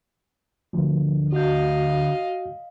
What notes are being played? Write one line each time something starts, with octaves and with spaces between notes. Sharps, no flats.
D2 F3
F#4 D#5 F5 G6